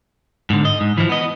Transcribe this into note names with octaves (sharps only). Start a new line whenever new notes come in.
G#2 D3
D#5
G#2
E3 F3
B3 D#5